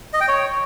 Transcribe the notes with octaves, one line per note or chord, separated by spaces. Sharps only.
D#5
G5
C#5